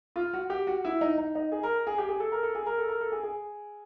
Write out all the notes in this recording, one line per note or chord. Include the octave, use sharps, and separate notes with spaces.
F4
F#4
G4
F#4
E4
D#4
D#4
D#4
G#4
A#4
G#4
G4
G#4
A4
A#4
A4
G#4
A#4
A4
A#4
A4
G#4
G#4